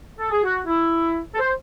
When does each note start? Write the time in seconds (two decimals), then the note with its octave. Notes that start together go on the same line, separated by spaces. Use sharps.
0.18 A4
0.31 G#4
0.43 F#4
0.66 E4
1.34 A4
1.38 C5